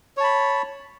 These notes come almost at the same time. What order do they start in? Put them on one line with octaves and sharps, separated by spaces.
C#5 A5 B5